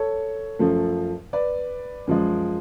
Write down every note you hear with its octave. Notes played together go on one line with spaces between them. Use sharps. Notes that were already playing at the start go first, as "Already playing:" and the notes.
Already playing: A4 C#5
F#2 F3 A3
B4 D5
F#2 F3 G#3